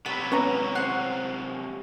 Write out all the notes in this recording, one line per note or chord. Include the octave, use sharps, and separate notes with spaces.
C3 F#3 B3 B5 B6
E3 B3 C#4 C#5 A#5
C5 F#5 F#6 C7